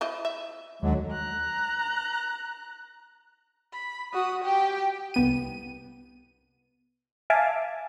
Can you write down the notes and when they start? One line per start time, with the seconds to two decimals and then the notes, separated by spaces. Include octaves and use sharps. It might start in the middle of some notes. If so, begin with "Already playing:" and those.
0.01 F3 E4 D#5
0.25 E5
0.82 D#2 D3 F#3 G#3
1.11 A#5 F#6
3.72 B5
4.13 F#4 D#6
4.45 G4 G5
5.14 C2 B3 D#7
7.30 E5 F5 G#5 A5 D6